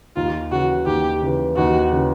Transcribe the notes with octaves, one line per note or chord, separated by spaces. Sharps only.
D#2 F4
C#3 E3 F#4
D#2 G4
C#3 E3
D#2 F#4
C#3 E3